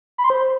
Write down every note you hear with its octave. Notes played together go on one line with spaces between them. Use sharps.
B5
C6
C5